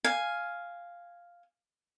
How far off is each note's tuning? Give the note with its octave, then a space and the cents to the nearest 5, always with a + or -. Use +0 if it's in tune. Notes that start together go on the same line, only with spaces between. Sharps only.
F5 +0 G#5 +0